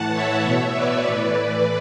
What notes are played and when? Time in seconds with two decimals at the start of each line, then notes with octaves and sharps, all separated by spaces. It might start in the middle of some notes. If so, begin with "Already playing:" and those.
Already playing: A2 E3 F#5 A5
0.12 C#5 E5
0.44 B2
0.74 B4 D5
1.04 A2 E3
1.35 B4 D5